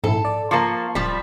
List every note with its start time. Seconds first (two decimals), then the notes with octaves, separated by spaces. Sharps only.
0.04 A#1 G#2 E4 A4
0.25 D5
0.51 F3 A#3 A5 C6 C#6
0.95 D1 F3 G3 B6